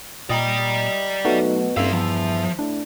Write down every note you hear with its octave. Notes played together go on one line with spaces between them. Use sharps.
A#2 D5 D#5 G5 A#5
B2 F#3 A3 D#4 F#4
F#1 G2 C4 E5 F5
E2 F3
A2 D4